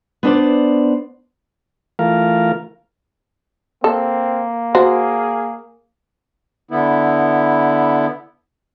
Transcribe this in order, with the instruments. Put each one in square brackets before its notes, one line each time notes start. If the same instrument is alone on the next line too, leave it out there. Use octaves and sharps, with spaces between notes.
[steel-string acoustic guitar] B3 D4 C5 D5
[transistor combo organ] E3 A3 F4 A#4 F5
[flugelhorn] A#3 [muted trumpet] C4 [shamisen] A4
[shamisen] F#4 C5 [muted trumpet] G#4
[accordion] D3 B3 E4